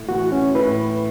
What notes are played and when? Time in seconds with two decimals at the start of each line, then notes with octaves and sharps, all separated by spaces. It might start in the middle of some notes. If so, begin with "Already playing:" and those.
Already playing: A2
0.09 E3 B3 F#4
0.32 C#4
0.55 A2 B4